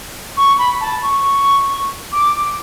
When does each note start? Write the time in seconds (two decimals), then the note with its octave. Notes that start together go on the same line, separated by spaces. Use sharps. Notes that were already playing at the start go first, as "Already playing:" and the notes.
0.36 C#6
0.58 B5
0.80 A5
1.02 C#6
2.12 D6